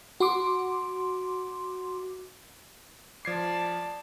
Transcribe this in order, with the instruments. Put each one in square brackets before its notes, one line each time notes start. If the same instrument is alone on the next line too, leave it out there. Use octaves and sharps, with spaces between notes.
[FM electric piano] F#4 C6 D6
[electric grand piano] F3 G#6 C7 [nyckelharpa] D5 A5